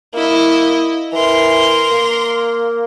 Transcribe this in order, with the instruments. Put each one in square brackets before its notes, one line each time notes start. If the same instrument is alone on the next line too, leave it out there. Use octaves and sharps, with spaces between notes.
[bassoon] A#3 [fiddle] E4 D#5
[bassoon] E3 [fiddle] A#4 C6
[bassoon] A#3